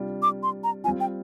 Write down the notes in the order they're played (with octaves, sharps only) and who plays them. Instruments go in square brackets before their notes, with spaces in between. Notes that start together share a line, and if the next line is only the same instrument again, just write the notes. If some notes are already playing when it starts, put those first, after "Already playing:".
Already playing: [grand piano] C3 G3 D4 F4
[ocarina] D6
C6
A#5
[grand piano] G3 C4 F4 [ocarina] G#5
[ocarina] G5